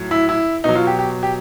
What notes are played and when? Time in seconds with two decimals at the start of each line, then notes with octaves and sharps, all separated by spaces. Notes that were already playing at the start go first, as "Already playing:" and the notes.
Already playing: A2 F#3
0.11 E4
0.29 E4
0.64 B2 F#3 D#4
0.75 F4
0.87 G4
0.99 G4
1.23 G4